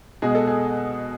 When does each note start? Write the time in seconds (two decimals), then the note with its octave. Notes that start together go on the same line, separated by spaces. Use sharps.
0.22 B2 G#3 G#4
0.35 A4
0.47 G#4